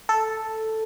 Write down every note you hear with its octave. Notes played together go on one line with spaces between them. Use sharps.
A4